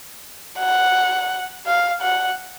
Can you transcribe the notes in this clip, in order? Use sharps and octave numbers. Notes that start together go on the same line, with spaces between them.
F#5
F5
F#5